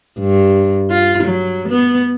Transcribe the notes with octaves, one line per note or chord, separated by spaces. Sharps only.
G2
F4
F#3
B3